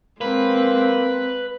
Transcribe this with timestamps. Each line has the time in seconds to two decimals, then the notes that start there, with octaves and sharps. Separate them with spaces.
0.21 G#3 A#3 C4 B4